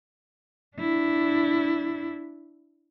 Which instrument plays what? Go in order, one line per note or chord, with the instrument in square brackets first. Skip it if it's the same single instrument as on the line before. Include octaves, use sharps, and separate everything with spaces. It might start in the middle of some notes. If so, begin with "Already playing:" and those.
[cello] D4 E4